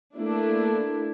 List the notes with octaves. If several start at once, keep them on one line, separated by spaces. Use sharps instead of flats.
A3 A#3 D4 E4